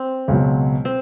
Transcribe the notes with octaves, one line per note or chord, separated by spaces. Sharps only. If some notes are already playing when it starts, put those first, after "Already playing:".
Already playing: C4
C#2 B2 F#3
C4